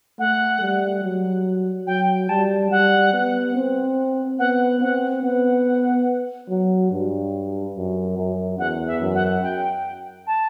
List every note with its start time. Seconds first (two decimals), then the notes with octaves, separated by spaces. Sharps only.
0.19 A3 F#5
0.61 G3
1.03 F#3
1.87 F#3 G5
2.23 G5
2.29 G3 A5
2.71 G3 F#5
3.13 B3
3.55 C4
4.39 B3 F#5
4.81 C4 F#5
5.23 B3 F#5
6.49 F#3
6.91 G2
7.76 F#2
8.17 F#2
8.59 E2 F#5
8.87 E5
9.01 F#2
9.15 F#5
9.43 G5
10.27 A5